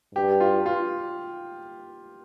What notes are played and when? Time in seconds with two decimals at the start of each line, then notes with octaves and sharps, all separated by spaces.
0.15 G2 G4
0.40 F4
0.66 F4